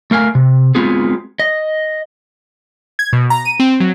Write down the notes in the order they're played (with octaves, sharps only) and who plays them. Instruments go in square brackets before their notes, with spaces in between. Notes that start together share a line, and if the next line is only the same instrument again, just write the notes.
[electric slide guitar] A3 A#4 F5 G#5
C3
G#3 B3 C4 F4 F#4 G#4
D#5
[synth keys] G#6
B2
A#5
D#7
C4
F#3